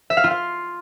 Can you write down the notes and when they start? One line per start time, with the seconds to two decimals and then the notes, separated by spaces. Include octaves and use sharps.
0.10 E5
0.17 F5
0.24 F4
0.31 F5